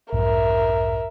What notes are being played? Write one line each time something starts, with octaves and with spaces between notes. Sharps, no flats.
B1 F2 G#2 A#4 E5